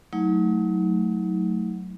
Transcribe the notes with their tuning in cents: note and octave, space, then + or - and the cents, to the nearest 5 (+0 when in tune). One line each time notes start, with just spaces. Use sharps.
F#3 +0 A3 +0 D#4 +40